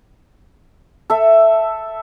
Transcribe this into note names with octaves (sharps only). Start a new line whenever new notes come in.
A4 E5